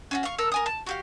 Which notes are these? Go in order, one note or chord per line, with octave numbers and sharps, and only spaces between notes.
C#4 F4 F#4
F5 C#6
A4 A#4 E6
A#4 G#5 D#6
A5
F#4 G4 F5